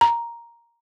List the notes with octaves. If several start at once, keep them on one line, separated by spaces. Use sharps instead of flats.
A#5